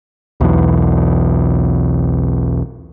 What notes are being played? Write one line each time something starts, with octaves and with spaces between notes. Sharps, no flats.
B1 E2